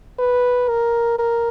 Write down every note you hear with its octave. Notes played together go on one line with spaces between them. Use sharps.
B4
A#4
A#4